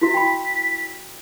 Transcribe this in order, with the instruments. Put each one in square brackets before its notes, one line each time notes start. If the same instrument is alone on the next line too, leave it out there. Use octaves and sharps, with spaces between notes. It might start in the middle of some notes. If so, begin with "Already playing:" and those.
[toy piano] E4 F#4 E5 [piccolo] B6
[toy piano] G5 B5